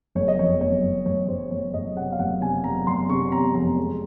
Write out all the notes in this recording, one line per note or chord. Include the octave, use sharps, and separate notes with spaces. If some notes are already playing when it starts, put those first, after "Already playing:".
F#1 C#5
D#5
F2 C#5
F#1 C#5
F#1
F#1 C#5
F#1 C5
F#1 C#5
F#1 D#5
C3 F#5
F5
F#1 F#5
C3 G#5
F#1 A#5
F#1 C6
C3 C#6
C3 A#5
F2 A#5
G#3